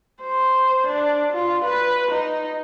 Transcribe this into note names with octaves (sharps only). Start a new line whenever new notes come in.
C5
D4
F4
B4
D#4